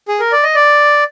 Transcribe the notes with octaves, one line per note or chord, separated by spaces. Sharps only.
G#4
A#4
D5
D#5
D5